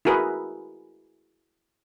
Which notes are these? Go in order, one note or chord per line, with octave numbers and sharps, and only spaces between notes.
E4 F#4 G#4 A#4 B4